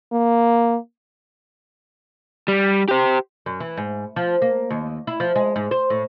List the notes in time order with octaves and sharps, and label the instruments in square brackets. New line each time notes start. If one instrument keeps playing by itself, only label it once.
[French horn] A#3
[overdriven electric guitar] G3
G4 C5
[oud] F#2
E3
G#2
F3
A#3
D#2
E4
F3
G#3
G#2
C5
A2